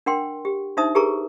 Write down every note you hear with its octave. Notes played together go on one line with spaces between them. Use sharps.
D4 A#4 F#5 G5 C6
G4
D4 D#4 C5 E5 A5 D#6
G4 G#4 A#4 B4 A#5 C#6